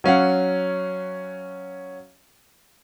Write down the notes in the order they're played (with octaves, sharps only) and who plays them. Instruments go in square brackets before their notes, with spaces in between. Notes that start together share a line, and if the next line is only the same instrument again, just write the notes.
[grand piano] F#3 C#4 F5 F#5